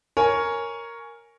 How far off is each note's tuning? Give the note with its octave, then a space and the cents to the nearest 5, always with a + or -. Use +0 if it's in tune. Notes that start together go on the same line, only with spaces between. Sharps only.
A#4 +0 C#5 +5 G#5 +0